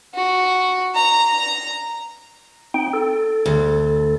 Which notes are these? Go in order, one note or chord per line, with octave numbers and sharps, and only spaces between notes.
F#4
A#5
C4 D#4 G5
A4
D2